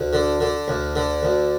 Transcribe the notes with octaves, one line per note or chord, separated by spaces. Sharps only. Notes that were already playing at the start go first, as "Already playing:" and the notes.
Already playing: D2
D3
D3
D2
D3
D2